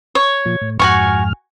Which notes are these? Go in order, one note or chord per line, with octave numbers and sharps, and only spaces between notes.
C#5
A#2 F3
A2
F2 G#2 F#4 G#5 C#6 F6